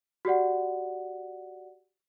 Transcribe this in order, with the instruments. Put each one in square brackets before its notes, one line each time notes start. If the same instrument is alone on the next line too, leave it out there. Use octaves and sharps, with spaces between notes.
[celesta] F#4 G4 D5 F#5